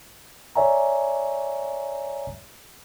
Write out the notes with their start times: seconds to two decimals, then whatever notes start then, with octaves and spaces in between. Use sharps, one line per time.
0.56 C#5 D5 E5 G#5 A#5